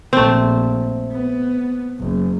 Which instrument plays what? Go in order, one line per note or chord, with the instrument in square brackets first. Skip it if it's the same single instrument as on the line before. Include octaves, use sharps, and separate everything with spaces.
[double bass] A#1 [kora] A3 C4
[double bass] B3
F#1